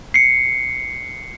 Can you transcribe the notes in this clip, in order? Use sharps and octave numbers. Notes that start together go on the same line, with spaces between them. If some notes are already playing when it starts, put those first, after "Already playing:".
C7 C#7